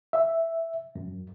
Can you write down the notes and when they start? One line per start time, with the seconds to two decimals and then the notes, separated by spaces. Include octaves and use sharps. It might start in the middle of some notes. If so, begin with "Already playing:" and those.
0.13 E5
0.95 F#2